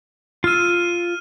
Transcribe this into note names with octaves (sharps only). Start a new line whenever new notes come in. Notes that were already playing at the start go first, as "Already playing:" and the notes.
F4 E6 F6 D#7